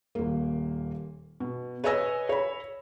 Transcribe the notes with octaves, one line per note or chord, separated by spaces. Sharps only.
D#1 A#3
B2
B4 C#5 D#5 G#5 E6 A#6
C#5 B5